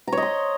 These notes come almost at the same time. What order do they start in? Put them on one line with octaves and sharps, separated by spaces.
A#5 C#5 D#5 C6